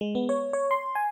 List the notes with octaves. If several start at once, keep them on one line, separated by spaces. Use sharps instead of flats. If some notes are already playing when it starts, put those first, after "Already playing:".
G#3
B3
C#5
C#5
C6
G#5